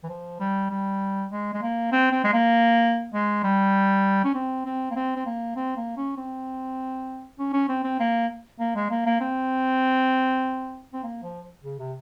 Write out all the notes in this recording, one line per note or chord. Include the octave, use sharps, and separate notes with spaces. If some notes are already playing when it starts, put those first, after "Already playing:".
E3
F3
G3
G3
G#3
G#3
A#3
C4
C4
G#3
A#3
G#3
G3
C#4
C4
C4
A#3
C4
C4
A#3
C4
A#3
C#4
C4
C#4
C#4
C4
C4
A#3
A#3
G#3
A#3
A#3
C4
C4
A#3
F3
C#3
C3